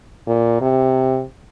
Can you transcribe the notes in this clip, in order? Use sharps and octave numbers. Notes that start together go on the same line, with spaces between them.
A#2
C3